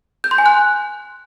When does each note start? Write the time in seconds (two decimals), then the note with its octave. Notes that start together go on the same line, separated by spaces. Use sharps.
0.24 G6
0.31 C6
0.38 G#5
0.46 F#6